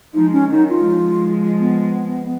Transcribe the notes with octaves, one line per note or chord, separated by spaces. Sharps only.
F3 G#3 D#4
C#4
D#3 F#3 D#4
F4
F3 G#3
B3